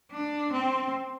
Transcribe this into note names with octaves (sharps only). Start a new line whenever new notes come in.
D4
C4